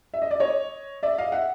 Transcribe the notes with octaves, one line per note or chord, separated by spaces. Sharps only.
E5
D#5
D5
C#5 D#5
D5 E5
D#5 F5
E5 F#5